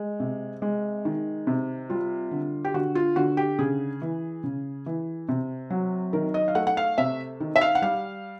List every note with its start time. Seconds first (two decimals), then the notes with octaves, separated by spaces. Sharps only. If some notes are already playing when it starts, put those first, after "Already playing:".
Already playing: G#3
0.20 C3
0.62 G#3
1.05 D#3
1.47 C3
1.90 G3 F4
2.31 D3
2.65 G4
2.74 D3 F#4
2.95 F4
3.16 D3 F#4
3.37 G4
3.59 C#3 G#4
4.02 E3
4.44 C#3
4.86 E3
5.29 C3
5.70 F#3
6.13 D#3 A#4
6.34 D#5
6.48 F5
6.55 A3 F#5
6.67 F#5
6.77 F5
6.98 C3 E5
7.40 D#3
7.56 E5
7.61 F5
7.75 F#5
7.82 G3 F5